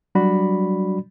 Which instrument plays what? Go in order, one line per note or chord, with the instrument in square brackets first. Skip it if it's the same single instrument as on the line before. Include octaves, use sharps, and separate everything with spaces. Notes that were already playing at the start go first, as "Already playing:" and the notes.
[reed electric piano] F#3 G3 D4 F#4 D5 B5